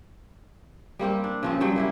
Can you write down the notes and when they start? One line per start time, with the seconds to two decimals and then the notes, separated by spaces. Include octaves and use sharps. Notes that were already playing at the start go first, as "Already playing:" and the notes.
0.99 G3 A#3 C4 G4
1.24 D4
1.43 C#3 F3 C4
1.60 C#3 F#3 G3 G5
1.76 A#3 E4 G4